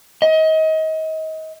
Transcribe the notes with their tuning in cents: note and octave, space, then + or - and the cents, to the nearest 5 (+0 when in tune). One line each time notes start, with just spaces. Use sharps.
D#5 +30